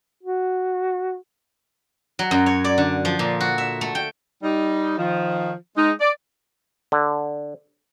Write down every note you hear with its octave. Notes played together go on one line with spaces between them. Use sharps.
F#4
F#3
F#2
C#5
D5
D3
F3
A#2
F#4
E5
A3
G5
G3 D#4
D#3 F3
G#3 D#4
D5
D3